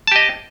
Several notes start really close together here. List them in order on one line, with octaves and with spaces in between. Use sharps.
A5 G4 D#5